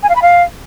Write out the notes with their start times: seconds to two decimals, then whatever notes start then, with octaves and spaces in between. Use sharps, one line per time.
0.02 G#5
0.09 F5
0.15 B5
0.21 F5